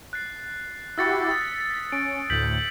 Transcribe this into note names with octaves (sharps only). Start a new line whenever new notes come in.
F#6 A6 C7
E4 F#4 G4 E6 A6 C#7
D#6 B6
C#4 D7
D2 A2 G6 B6 F#7